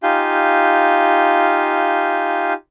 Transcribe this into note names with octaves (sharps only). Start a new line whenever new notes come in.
D#4 F4 G4 F5 G#5 G6